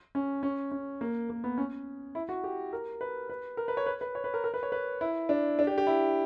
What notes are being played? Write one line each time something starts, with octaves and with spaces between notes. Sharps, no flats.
C#4
C#4
C#4
A#3
A#3
B3
C#4
E4
F#4
G4
A#4
B4
B4
A#4
B4
C#5
B4
B4
C#5
B4
A#4
A#4
B4
C#5
B4
E4
D4
D4
G4
G4
E4